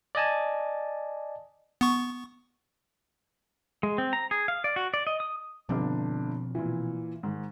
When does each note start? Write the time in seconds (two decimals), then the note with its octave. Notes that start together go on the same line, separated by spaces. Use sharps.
0.15 D5 D#5 G#5 A5
1.81 B3 C#6
3.83 G#3
3.98 C4
4.13 A#5
4.31 G#4
4.48 F5
4.64 D5
4.76 F#4
4.94 D5
5.07 D#5
5.20 D#6
5.69 G1 B2 F3 C4 D4 D6
6.55 A#2 E3
7.23 G#2 D#3